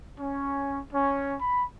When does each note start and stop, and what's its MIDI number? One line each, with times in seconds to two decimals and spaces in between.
0.19 0.80 61
0.93 1.36 61
1.40 1.64 83